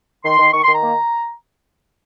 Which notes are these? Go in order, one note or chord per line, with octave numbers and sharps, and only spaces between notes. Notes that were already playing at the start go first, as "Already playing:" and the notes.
D#3 C6
D#3
D#3 C#6
C6
D#3
A#5
A#3